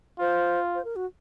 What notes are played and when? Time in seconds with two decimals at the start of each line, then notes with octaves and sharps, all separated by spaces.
0.19 F4 C5
0.75 C5
0.85 A#4
0.96 F#4